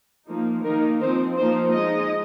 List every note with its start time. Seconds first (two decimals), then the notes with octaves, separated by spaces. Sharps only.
0.27 F3 A#3 D#4
0.64 D#3 A#3 D#4 A#4
1.00 F3 C4 D#4 C5
1.37 F3 A#3 D#4 C5
1.73 G#3 D#4 D#5